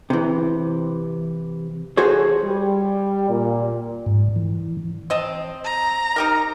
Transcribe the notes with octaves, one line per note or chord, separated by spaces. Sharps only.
C3 E3
F#4 G#4 A4 C5 C#5
G3
A#2
G#2
E3
C4 D#5 A5
A#5
D#4 G4 A#4